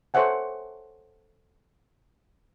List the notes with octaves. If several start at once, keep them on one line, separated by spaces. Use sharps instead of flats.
A4 C5 C#5 E5 F#5 G#5